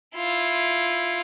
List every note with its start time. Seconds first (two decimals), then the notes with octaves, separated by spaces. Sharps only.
0.15 E4 F4